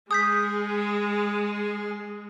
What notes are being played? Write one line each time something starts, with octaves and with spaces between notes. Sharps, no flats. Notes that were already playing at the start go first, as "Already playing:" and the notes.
G#3 G#4 D#6 G6 B6